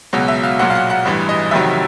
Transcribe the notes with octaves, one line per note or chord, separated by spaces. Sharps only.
C#2 B2 F#3
E5
F5
B1 A#2 F#3 F#5
F5
F#5
F#5
A1 G2 E3
D#5
F1 F2 C3 D#3 F#3 E5